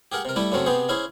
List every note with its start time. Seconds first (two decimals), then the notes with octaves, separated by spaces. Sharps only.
0.12 G4 G#4 A#4 F#5
0.25 C3 A#4
0.36 G3 A3 E4 G4
0.52 F#2 C#3 F#3 A3 C4
0.66 C3 B3 G4 G#4 C5
0.89 C#4 E4 G#4 C5